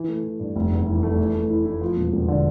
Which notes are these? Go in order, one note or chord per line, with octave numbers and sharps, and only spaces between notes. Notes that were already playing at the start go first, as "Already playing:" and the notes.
Already playing: E3
A3
E3
G2
F1
E2
E3
A3
E3
A3
E4
E4
F3
E1
E1
D3